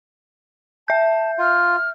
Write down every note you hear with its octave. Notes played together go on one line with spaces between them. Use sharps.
E5 A5 G6
F4 F6